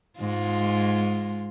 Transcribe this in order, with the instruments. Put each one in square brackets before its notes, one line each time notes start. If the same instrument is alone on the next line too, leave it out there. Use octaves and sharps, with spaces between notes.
[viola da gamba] G#2 G#3 F4